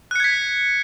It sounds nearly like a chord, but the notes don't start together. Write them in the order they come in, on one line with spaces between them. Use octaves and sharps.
F#6 C#7 G#6 B6